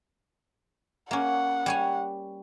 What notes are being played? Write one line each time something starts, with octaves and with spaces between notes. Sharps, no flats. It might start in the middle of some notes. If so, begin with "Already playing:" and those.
A#3 C#4 F#5
G3 C#5 G#5